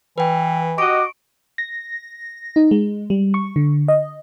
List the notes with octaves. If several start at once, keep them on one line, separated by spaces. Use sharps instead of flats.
E3 B4 G5
F#4 G4 D#5 C#6 D6 D7
A#6
D#4
G#3
G3
C#6
D3
D#5